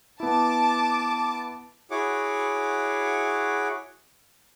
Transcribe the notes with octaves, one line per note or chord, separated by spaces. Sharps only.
B3 E4 A5 D6
E4 F#4 G#4 C#5 F#5 D6